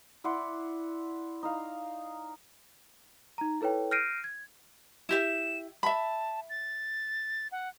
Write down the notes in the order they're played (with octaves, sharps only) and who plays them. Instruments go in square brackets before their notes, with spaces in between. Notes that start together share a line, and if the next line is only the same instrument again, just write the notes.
[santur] E4 D5 F#5 C6
D#4 F5
[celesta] D#4 A#5
E4 A4 B4 C#5 G5
F6 G6 A#6 C7 D7 D#7
G#6
[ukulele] E4 G4 E5 [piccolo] E7
[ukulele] E5 B5 [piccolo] A5
[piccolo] A6
F#5